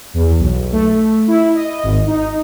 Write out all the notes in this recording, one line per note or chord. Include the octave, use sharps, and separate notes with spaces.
E2
B1
A3
E4
D#5
G#1
D#4